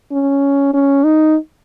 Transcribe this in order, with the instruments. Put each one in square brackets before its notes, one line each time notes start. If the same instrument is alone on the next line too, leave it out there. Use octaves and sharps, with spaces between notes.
[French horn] C#4
C#4
D#4